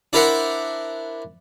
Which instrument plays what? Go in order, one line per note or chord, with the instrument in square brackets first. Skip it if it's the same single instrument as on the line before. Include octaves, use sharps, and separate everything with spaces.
[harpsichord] D4 E4 A#4 C5 E5 F#5